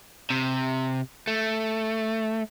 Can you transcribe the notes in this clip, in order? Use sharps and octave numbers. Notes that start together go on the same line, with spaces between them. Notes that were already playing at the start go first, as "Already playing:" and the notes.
C3
A3